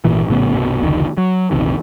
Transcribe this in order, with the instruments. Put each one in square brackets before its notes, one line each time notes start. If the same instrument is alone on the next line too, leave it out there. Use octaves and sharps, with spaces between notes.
[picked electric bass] G#1 A#2 E3
A#1 A2 C#3 B3
C2 G2 B2
F1 C#2 D3 D#3
F#3
A#1 E2 C3 D#3